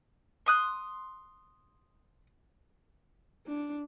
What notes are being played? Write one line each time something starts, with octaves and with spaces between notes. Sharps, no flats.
C6 D#6 F#6
D4